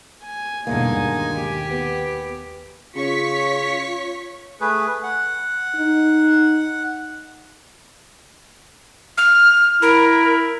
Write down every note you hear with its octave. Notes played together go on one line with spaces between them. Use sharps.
G#5
E2 G2 B2 D3 G#3 A#3 D#4
D#2
G4
B3
C#3 F4 C#5 C#6 B6
A3 G#4 B4
F#5
D#4
F6
E4 A#4